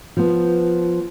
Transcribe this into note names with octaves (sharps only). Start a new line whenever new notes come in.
F3 B3